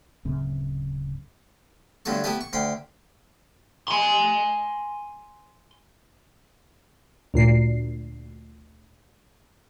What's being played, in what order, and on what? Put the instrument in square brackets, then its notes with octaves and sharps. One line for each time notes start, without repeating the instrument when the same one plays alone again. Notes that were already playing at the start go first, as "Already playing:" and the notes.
[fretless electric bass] D1 F#2 C#3 C4
[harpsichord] G2 D3 F#3 A3 A4 C#6
A3 B3 E4 G4 A4 B4
C#6
D2 G5 B5 C6
[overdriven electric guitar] G#5 C6
[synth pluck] D2 A#2 C7